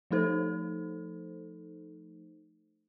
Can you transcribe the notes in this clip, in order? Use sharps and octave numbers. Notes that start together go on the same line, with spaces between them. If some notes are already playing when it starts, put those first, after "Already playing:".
F3 A3 D#4 A4 C5